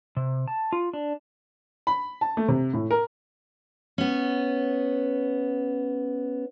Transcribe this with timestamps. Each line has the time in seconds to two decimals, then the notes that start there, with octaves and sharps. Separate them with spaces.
0.17 C3
0.48 A5
0.73 F4
0.93 D4
1.87 B5
2.21 A5
2.37 A3
2.48 C3
2.73 A2
2.91 A#4
3.98 B3 C#4